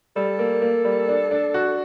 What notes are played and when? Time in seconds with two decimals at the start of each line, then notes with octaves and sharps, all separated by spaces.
0.16 G3 A4
0.39 A#3
0.62 A#3
0.85 G3
1.08 D4
1.31 D4
1.54 F#4